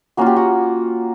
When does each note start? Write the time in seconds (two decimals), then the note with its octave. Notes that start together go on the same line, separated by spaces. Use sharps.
0.17 A#3 C#4 F4 F#4
0.26 G4
0.36 F#4